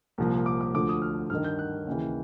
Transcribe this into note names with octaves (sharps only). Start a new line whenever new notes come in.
C2 A#2 F3
D6
D6
D2 D3 F3 D6
D#6
F6
G2 D#3 F6
G6
F#6
D#2 C#3 E3